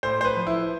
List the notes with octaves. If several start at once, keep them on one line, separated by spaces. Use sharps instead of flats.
A2 C5
C5
B4
F3
E4